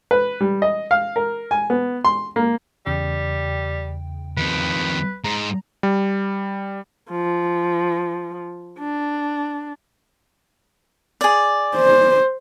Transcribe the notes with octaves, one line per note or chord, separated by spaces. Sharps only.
B4
G3
D#5
F5
A#4
G#5
B3
C6
A#3
E2 C#3 G3 G5
F2 D#3 B4
G#2 A#5
G3
F3
D4
G#4 D5
C5